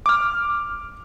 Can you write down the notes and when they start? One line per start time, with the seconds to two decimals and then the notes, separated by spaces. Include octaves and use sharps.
0.06 D6 F6